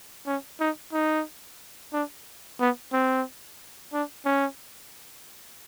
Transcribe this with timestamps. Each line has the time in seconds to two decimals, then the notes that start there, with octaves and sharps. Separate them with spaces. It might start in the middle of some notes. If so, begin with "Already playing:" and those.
0.27 C#4
0.60 D#4
0.93 D#4
1.93 D4
2.60 B3
2.93 C4
3.93 D4
4.26 C#4